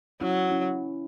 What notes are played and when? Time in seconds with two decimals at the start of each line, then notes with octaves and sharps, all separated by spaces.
0.21 F#3 C#4 E4
0.51 C#4 E4